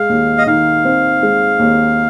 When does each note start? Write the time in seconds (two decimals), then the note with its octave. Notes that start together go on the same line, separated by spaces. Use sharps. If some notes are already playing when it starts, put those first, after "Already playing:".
Already playing: G#3 F5
0.09 D#2
0.38 D#5
0.47 D#3 F5
0.85 C4
1.23 G#3
1.59 D#2